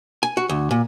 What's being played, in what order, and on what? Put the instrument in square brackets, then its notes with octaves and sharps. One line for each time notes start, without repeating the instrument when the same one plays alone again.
[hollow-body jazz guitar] G#5
F#4
D2
A#2